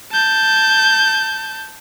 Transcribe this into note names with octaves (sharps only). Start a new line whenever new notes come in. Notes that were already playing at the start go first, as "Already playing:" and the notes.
A5 G6